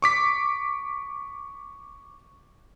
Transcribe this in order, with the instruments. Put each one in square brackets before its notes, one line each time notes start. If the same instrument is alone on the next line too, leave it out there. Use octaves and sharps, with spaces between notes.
[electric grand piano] C#6 D6 B6